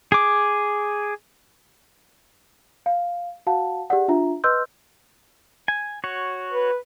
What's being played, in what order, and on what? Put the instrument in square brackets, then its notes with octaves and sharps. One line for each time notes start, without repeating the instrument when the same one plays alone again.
[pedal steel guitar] G#4 D6
[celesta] F5
F#4 F5 F#5 A5
G4 G#4 D5 F#5
D4 F4 E5 A#5
B4 D#5 C6 E6 F6 G6
[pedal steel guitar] G#5
F#4 C#5
[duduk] B4